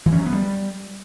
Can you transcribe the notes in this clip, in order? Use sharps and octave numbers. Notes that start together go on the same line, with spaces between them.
E3
C#4
F#3
B3
G3